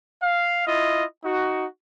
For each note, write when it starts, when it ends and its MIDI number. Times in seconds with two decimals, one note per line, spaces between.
0.22 0.67 77
0.68 1.04 64
0.68 1.04 65
0.68 1.04 75
1.24 1.66 63
1.24 1.66 66